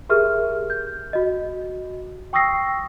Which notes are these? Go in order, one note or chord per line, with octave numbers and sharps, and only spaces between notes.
G4 G#4 A#4 E5 F6
G6
F#4 D#5
G5 C#6 D#6 E6 A#6 C7